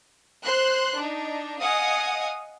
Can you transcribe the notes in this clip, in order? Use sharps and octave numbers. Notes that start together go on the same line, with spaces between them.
C5 C6 F#6
D4 D#4
D#5 F5 F#5 G#5 D#6